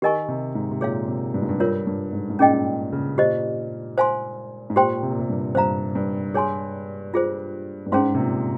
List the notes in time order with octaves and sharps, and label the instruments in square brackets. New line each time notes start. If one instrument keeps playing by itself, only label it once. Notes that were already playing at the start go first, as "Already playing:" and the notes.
[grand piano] D#3 [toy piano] G4 A#4 D#5 G#5 C#6
[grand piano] C3
G#2
C3
[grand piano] A#2 [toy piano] G#4 C#5 F5
[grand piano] C3
G2
G#2
G2
[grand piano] G2 [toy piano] F4 A#4 C#5
[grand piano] G2
G#2
G#2
[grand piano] A#2 [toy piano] C#4 G#4 D#5 G5
[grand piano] C#3
[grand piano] A#2 [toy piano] G4 C5 D#5
[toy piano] C5 F5 G#5 C6
[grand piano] G#2
[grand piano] A#2 [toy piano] G4 C5 G5 C6
[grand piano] C3
A#2
C3
G2
[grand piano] G2 [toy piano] C5 F5 A#5
[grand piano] G2
[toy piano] G#4 C#5 G#5 C6
F4 G#4 C5
[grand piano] G2
[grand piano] G#2 [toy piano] C#4 G#4 C5 F5 C6
[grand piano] C3
A#2